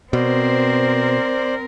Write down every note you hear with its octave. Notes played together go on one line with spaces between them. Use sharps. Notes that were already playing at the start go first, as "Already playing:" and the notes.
B2 C4 A#4 C5 D5